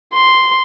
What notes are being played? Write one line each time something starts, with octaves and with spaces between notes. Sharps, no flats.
C6